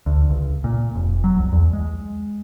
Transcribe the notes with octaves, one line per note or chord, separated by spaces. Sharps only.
D2
C#2
A#2
F1
F#3
C2
E2
G#3